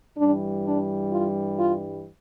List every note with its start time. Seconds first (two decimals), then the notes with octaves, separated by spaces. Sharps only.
0.17 G2 E3 G3 D4
0.65 D4
1.12 F4
1.59 F4